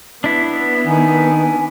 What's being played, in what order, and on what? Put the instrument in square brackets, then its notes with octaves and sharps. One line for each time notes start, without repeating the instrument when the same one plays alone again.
[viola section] B3 [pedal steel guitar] D4 E4
[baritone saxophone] D#3 [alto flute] G#5